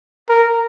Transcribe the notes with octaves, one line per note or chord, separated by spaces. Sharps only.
A#4